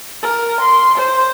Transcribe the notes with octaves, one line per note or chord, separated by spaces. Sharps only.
A#4
C6
C5